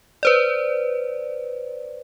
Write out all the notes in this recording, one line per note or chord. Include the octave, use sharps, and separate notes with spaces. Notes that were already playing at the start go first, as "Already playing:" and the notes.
B4 C5 D5